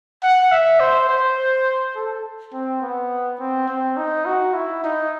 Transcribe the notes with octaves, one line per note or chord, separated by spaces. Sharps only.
F#5
E5
C5
C5
A4
C4
B3
C4
C4
D#4
F#4
E4
D#4